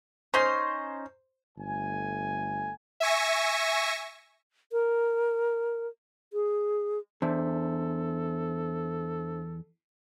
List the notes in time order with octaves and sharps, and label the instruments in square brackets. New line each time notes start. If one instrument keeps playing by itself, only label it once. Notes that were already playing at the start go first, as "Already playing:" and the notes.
[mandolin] C#4 D#4 C6 [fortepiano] C5
[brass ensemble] G1 A3 G#5
[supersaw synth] E5 G#5 C#6 A#6
[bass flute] A#4
G#4
[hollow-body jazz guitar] E2 [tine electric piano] D4 C5 E5 [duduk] A4